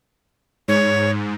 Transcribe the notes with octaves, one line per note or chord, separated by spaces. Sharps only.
G#2 C#5